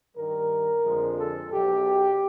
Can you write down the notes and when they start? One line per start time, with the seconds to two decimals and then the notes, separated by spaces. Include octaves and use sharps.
0.17 G2 D#3 G3 A#4
0.84 F2 D3 F3 G#3
1.18 A4
1.52 B1 B2 F#3 G4